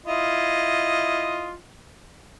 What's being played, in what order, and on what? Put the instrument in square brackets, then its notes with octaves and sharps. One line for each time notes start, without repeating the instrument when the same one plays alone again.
[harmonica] E4 F4 D#5